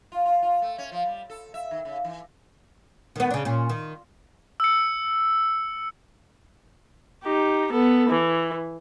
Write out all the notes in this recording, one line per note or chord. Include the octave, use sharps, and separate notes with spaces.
F4
F4
F4
A3
C#4
F3
G3
A4
E5
D#3
C#3
E3
D#3 B3
C#3 D4
A#2 C#4
D#3
E6 C#7
D#4 G4
B3 A4
E3